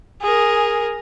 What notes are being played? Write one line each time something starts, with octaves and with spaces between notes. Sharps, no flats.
G#4 A#4